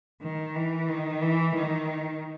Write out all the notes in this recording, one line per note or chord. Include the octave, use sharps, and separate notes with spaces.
D#3
E3
D#3
E3
D#3